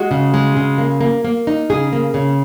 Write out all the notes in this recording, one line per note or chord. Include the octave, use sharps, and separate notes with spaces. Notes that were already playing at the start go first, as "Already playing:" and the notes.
Already playing: G#3 F#4
C#3
G#3
C#3
A#3
A#3
A#3
D#4
C#3 G#4
A#3
C#3